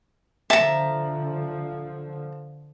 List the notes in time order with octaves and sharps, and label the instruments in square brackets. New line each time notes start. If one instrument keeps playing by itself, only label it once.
[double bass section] D3 F3 [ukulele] E5 [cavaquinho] A5 A#5